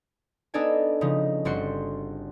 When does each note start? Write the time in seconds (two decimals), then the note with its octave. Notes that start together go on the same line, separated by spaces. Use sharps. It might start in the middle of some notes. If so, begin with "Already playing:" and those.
0.54 B3 D4 D#4 A4 D5 G#5
1.01 C#3 F3 D#4
1.45 G1 G3 C4 F#4 C6 C#7